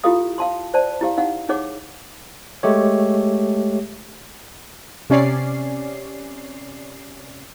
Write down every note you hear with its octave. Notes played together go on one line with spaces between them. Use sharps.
E4 F4 G4 A4 F5 D#6
F5 A5 C6
C5 D5 A5
E4 G4 F5
D#4 F5 F#5
D#4 G#4 C#5 F#5 D6
G#3 A3 G4 C#5
C3 C#4 D5 C7